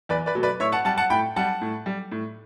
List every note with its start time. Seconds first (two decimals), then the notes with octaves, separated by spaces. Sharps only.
0.09 E2 B4 D5
0.26 B4 D5
0.35 B2 F#3 A3
0.43 B4 D5
0.60 A2 C#5 E5
0.72 F#5 A5
0.85 G3 F#5 A5
0.97 F#5 A5
1.10 A2 G5 B5
1.36 G3 F#5 A5
1.61 A2
1.86 G3
2.12 A2